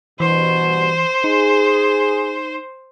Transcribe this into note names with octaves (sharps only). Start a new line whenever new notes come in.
G2 B2 E3 C5
D#4 G#4